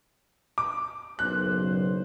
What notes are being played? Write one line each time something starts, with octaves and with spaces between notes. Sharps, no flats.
D6
F#1 B1 C5 F#6